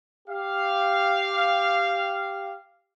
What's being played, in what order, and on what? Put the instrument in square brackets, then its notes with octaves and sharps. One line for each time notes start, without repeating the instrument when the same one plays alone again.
[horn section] G4 F5